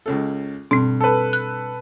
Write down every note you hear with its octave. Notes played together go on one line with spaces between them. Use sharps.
C#2 C#3 A4
G2 B2 C4
A4 B4
F#6